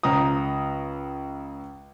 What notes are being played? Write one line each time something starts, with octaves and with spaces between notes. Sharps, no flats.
C#2 A#5 D#6